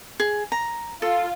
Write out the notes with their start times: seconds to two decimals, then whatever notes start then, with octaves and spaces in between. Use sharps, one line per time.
0.20 G#4
0.52 A#5
1.02 F4 A4